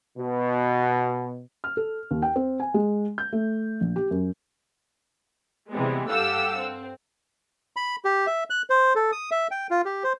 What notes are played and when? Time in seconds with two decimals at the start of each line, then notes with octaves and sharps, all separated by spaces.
0.17 B2
1.64 F6
1.77 A4
2.11 D#2
2.22 G5
2.36 C4
2.60 G#5
2.74 G#3
3.18 G6
3.32 A3
3.81 A#1
3.96 G4
4.11 F#2
5.71 C3 E3 G3 G#3 B3
6.08 G2 G4 A4 F5 F#5 E6
6.58 C4
7.76 B5
8.05 G4
8.27 E5
8.50 F#6
8.70 C5
8.95 A4
9.12 D#6
9.31 E5
9.51 G5
9.71 F4
9.85 G4
10.04 C5